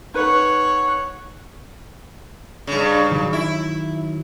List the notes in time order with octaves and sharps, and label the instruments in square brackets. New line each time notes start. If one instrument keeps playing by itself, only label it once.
[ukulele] D#4 B4 [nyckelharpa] C#5 F#5
[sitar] G2 C#3
[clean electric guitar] D#3 F#3
[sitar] E4